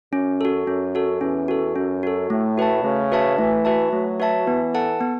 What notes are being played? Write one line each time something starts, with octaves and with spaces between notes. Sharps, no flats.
F#2 C#4
F#4 A4
F#2 C#4
F#4 A4
E2 C#4
F#4 A4
F#2 C#4
F#4 A4
A2 A3
F#4 B4 E5 A5
C#3 A3
F#4 B4 E5 A5
E3 A3
F#4 B4 E5 A5
F#3 A3
F#4 B4 E5 A5
E3 B3
A4 F#5 A5
B3